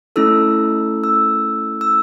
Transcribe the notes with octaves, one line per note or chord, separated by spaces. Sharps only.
A3 C#4 E4 A4 E6
E6
E6